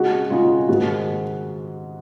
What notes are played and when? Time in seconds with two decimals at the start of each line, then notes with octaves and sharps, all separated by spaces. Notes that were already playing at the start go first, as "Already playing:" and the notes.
Already playing: C#3 G#3 D#4 F#4 G#4
0.30 C#3 G#3 D#4 F4 G#4
0.69 G#2 D#3 G#3 F#4